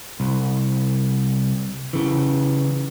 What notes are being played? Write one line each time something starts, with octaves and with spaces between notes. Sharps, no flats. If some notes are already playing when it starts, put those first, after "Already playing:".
C2
C#3 E3